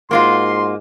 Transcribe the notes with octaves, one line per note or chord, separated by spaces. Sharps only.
G#2 A#3 F4 F#4 C6